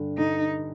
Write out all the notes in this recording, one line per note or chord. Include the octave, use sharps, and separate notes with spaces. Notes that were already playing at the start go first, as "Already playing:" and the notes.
Already playing: G2 D3
D3 D#4